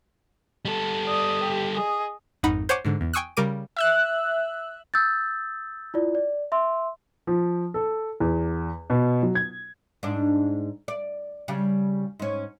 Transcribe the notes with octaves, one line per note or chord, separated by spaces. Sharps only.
G3 A4
D5 D#6
G4
G#4 D#5
G#1 F2 D#4 F#5 B5
C5 C#5 F#5 G#5 C#6 D6
G#2 D3
E2
G5 G#5 C#6 D#6 E6 F#6
C#3 G3 A#4 D6 D#7
E5 E6 F#6
D#6 E6 G6 A6
E4 F4 D5
D5
E5 C6 E6
F3
A4
E2
B2
F#3
G#6
G#2 D4
D5
C#3 G3
G#2 C#4